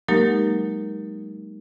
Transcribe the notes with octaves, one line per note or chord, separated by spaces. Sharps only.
F#3 G#3 A#3 D#4 G4 A#4